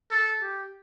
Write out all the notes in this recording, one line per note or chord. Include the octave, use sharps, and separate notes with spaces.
A4
G4